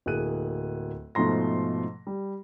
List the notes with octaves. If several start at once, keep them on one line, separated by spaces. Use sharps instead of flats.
D1 A#3 G#4 F#6 D#7
G#2 B2 F3 A3 C6 A#6
G3